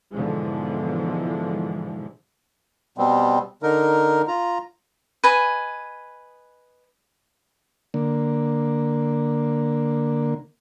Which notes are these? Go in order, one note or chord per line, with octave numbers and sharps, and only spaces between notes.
G#2 B2 D3 E3 F3 G#3
B2 G3 B3 C4
D3 D#4 A#4
F4 A#5
B4 D#5 G#5
D3 A#3